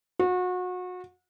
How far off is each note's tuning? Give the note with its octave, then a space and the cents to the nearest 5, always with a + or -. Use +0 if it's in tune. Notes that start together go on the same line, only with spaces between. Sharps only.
F#4 -30